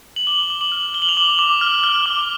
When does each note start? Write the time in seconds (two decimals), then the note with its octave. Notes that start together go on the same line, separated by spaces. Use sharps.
0.16 F#7
0.27 D6 G7
0.50 D6
0.61 F#7
0.72 F6
0.94 F6 G7
1.02 F#7
1.09 F7
1.17 D6 F#7
1.39 D6
1.61 F6
1.84 F6
2.06 D6